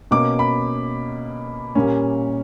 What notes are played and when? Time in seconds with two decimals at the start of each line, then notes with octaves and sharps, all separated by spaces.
0.11 B2 A#3 C#4 D6
0.39 B5
1.75 A#2 G3 A#3 C#4